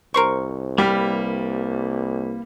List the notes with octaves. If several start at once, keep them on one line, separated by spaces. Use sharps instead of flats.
C2 A#4 C5 C#6
G3 A#3 B4 F6